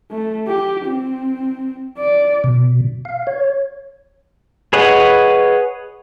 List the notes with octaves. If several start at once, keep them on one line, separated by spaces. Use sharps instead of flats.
A3
G4
C4
D5
B2
F5
C#5
G#4 B4 C#5 D#5 F#5